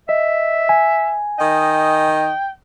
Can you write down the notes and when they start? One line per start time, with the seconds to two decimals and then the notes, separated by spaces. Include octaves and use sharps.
0.09 D#5 E5
0.69 G#5
1.39 D#3 D#5 G5